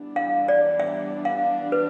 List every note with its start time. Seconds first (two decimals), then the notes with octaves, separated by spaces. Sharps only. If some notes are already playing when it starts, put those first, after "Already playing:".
Already playing: E3 G3 B3 D4
0.16 F5
0.48 D5
0.80 E5
1.25 F5
1.72 B4